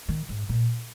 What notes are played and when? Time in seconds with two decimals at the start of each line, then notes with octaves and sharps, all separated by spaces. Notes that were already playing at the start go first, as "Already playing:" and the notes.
0.08 D#3
0.29 G#2
0.49 A#2